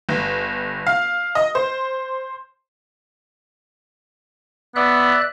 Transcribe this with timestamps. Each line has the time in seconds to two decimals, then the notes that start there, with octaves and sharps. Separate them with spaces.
0.09 G1
0.87 F5
1.35 D#5
1.55 C5
4.76 B3 D5 E5 F#6